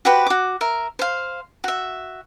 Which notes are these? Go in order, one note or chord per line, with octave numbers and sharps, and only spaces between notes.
F#4 G4 B4 C5
F#4 D6
A#4 E5
C5 F5
F#4 E5